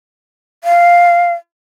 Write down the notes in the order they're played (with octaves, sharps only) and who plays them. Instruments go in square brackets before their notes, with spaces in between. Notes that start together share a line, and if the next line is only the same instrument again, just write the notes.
[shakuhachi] F5